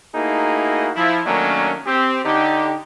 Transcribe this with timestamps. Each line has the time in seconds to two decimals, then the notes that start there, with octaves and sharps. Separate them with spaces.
0.15 A3 A#3 D#4 E4 F#4 G#4
0.96 F3 E4
1.26 D#3 F#3 A3 A#3 C#4 D4
1.87 C4 G4
2.25 D3 D#4 G4